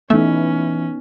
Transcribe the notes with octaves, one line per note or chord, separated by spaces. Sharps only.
E3 A3 B3 C#4 D#4 E5